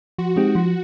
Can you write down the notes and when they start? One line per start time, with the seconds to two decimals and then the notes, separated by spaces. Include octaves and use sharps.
0.18 F3 F#4
0.36 G#3 C4 D#4 G4
0.55 F3